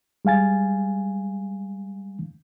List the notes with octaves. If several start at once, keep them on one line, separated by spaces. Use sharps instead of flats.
G3 G#3 F5 G#5 A6